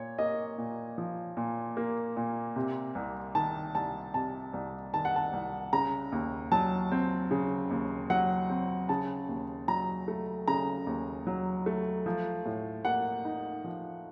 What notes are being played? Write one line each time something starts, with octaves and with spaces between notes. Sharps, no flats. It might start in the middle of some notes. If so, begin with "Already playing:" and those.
Already playing: A#2 C#5
A#3 D#5
A#2
F3
A#2
A#3
A#2
C3
C2
D#3 A5
C2 A5
C3 A5
C2
D#3 A5
F#5
A5
C2
C#3 A#5
D#2
F#3 A5
C4
C#3
D#2
F#3 F#5
C4
C#3 A5
D#2
F#3 A#5
A3
C#3 A#5
D#2
F#3
A3
F3
A2
A#3 F#5
D#4
F3